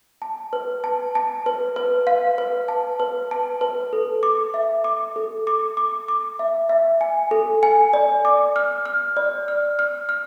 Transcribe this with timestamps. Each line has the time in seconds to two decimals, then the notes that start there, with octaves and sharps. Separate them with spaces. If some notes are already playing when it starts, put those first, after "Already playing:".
0.22 A5
0.53 B4
0.84 A5
1.15 A5
1.46 B4
1.76 B4
2.07 F5
2.38 B4
2.68 A5
3.00 B4
3.31 A5
3.61 B4
3.93 A4
4.23 D6
4.54 E5
4.84 D6
5.16 A4
5.47 D6
5.77 D6
6.08 D6
6.39 E5
6.69 E5
7.01 G#5
7.31 A4
7.63 G#5
7.93 D5
8.25 D6
8.56 F6
8.86 F6
9.17 D5
9.48 F6
9.79 F6
10.09 F6